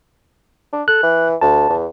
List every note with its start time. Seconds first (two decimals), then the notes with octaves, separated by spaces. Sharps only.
0.73 D4
0.88 A4 F#6
1.03 E3
1.41 D2 A5
1.69 E2